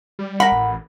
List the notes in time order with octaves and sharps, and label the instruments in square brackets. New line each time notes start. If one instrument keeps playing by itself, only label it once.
[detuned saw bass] G3
[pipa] A#4 B5 [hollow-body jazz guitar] F#5
[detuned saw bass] A1